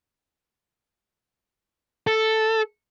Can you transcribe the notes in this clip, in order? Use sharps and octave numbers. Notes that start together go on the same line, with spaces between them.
A4